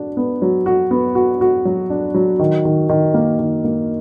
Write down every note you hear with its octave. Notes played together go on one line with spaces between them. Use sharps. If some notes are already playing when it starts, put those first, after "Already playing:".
Already playing: D4 F#4
B3
F#3
F#4
B3
F#4
F#4
F#3
D4
F#3
D#3
D#3
D#3
A#3
D#3
A#3